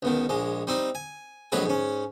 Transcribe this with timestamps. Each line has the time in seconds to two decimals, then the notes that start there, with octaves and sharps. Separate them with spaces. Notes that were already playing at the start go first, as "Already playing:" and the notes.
0.03 C#2 B2 D#3
0.29 A#1 G#3
0.67 G3 C4 D#4
0.95 G#5
1.52 A#1 F2 F#3 G#3 G#4 B4
1.66 G#2 C#4